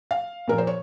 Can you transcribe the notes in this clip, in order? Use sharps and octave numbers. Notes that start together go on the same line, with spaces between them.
F5
A#2 F3 A#3 A#4
C5
C#5